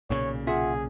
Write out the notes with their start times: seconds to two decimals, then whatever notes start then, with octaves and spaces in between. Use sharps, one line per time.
0.10 B1 A#2 C#3 C#5
0.47 F4 G#4 E5 F#5